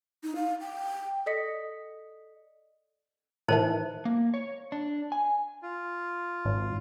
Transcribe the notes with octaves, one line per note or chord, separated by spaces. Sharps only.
D#4
F5
G5
A4 D5 D#5 D#6 B6 C#7
A2 D#3 E3 D#4 C5 A5
A#3
C#5
D4
G#5
F4
G#1